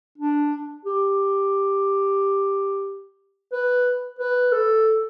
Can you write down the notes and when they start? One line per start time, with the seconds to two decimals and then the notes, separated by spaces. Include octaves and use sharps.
0.18 D4
0.85 G4
3.52 B4
4.19 B4
4.52 A4